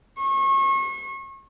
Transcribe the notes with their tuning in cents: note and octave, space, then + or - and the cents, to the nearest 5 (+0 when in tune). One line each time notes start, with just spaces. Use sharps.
C#6 -35